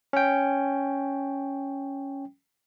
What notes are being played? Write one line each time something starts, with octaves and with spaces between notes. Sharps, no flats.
C#4 G5